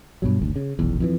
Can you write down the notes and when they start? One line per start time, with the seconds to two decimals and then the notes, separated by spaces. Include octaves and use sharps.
0.22 G2 B2 F#3
0.39 F#1 D2
0.56 C#3
0.79 F1 B1 E2
1.00 F2 D3 E3